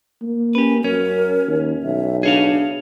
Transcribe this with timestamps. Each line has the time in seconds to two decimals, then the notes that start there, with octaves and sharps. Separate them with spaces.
0.22 A#3
0.55 C#4 G4 B4
0.84 F#2 C#4 A#4
1.47 D#2
1.83 B1 E5
2.23 D4 G#4 C#5 F5